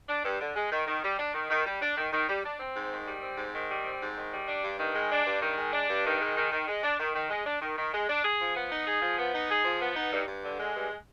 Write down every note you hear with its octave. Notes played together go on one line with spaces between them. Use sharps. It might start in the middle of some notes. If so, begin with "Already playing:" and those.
D4
G2
D3
G#3
D#3
D#3
G3
D4
D#3
D#3
G3
D4
D#3
D#3
G3
D4
C4
G#2
D#3
G3
C4
G#2
D#3
G3
C4
G#2
D#3
G3
D4
G2
D#3
G#3
D4
G2
D#3
G#3
D4
G2
D#3
G#3
D#3
D#3
G#3
D4
D#3
D#3
G#3
D4
D#3
D#3
G#3
D4
G#4
F3
B3
D#4
G#4
F3
B3
D#4
G#4
F3
B3
D#4
G2
G2
D3
G#3
G2